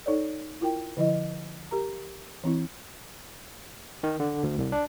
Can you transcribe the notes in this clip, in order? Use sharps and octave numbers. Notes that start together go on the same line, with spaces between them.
D#4 A4 C#5 D5
E4 F4 A#4 G5
D3 F3 E4 D#5
G4 A#4 A#5
E3 C4 E4
D#3
D3
D2
C2
D4